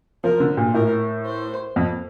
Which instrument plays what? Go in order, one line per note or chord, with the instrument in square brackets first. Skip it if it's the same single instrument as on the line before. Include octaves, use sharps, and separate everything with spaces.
[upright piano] F3 [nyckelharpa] A#4
[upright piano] D3
A#2
[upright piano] A2 [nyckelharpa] A#4
[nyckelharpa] C5
[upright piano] F2